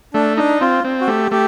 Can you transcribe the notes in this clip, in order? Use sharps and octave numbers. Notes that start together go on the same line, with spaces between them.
A3 D4
D4 D#4
C4 F4
C4
F#4
A3 G4
A3 G4